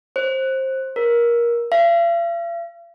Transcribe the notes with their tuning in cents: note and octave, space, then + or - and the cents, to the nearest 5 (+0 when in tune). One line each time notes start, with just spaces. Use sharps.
C5 +20
A#4 +20
F5 -45